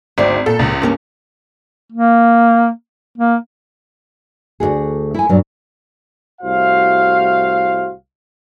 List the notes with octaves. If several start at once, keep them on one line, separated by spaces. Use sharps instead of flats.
G#1 D2 C4 D5
A#2 A4
C#2
G2 A#3 C#4
A#3
A#3
D2 B2 F#4 G#4
E4 G#5
G2 A#2 F#3
C2 A2 F#4 C5 F5